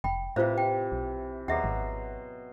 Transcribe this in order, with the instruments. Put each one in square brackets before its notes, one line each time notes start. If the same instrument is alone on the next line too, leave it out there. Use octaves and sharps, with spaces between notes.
[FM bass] F1 [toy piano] G5 B5
[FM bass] A2 [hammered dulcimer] C3 E3 [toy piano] F4 C5 F5
[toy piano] G5
[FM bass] B1
[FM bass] D#2 [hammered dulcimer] B2 F#3 C6 [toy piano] G#4 E5 F#5
[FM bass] G#1